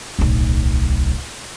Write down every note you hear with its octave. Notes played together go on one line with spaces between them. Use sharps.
D1 B1